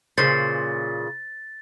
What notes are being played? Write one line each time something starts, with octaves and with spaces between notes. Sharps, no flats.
A#2 C#3 E3 C5 A6